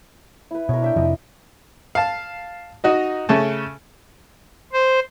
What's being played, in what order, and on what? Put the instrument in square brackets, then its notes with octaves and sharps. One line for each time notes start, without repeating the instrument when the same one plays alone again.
[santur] E4 B4
[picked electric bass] B2 [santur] A#4 C#5
[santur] D4 E5 G5
[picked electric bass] F2 C3 F3 [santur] D#5
[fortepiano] F5 A5
D#4 F#4 D#5
C#3 A3 C#4 A5
[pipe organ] C5